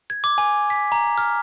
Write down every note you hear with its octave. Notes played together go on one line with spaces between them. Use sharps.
G#6
D6
G#5
B6
A#5
F6